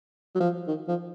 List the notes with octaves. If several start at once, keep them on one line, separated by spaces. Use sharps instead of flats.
F#3
F3
D#3
F3